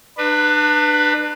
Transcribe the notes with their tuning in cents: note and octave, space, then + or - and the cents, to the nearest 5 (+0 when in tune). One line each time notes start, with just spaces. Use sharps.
D4 +35 B4 +0